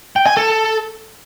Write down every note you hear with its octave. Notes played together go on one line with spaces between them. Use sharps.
G5
G#5
A4